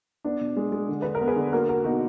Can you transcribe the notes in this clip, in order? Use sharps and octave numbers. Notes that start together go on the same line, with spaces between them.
B3 D4
B2
G#3
G#3
D3
D3 B4
A#4
B3
G#4 B4
D3
A#3 F#4 A#4
A#3 F#4 A#4
B2 D#4 F#4